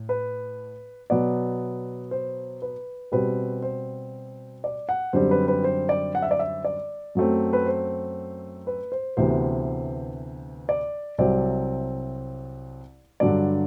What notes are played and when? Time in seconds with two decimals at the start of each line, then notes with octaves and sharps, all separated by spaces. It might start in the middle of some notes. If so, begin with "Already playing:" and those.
Already playing: A2
0.09 B4
1.10 B2 F#3 B3 D5
2.11 C5
2.62 B4
3.12 B2 G3 C4 B4
3.62 C5
4.64 D5
4.89 F#5
5.13 F#2 D3 G3 C4 C5
5.31 B4
5.48 B4
5.64 C5
5.89 D5
6.15 F#5
6.22 E5
6.31 D5
6.39 E5
6.64 D5
7.15 F#2 F#3 A3 C4
7.53 B4
7.66 C5
8.67 B4
8.92 C5
9.17 D2 C3 E3 B3 C5
10.69 D5
11.18 C2 C3 F#3 C4 D5
13.20 G2 D3 F#3 D5